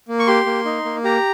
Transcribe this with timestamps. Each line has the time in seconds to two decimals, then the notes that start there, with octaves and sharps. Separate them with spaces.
0.08 A#3
0.19 C#6
0.27 G4 C6
0.46 A#3
0.65 D#4
0.85 A#3
1.04 G4 A#5